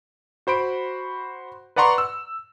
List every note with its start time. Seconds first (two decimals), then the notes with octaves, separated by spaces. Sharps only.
0.47 F#4 C5 B5 D7
1.76 B4 D5 F#5 A#5 C6 C#6
1.98 E6